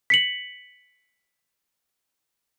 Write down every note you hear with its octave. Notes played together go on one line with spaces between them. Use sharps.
B6 C#7 F#7